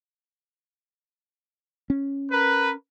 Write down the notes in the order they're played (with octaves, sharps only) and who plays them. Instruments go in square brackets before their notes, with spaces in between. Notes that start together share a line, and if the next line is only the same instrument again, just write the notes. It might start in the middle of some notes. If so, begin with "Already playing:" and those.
[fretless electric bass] C#4
[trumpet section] A#4 B4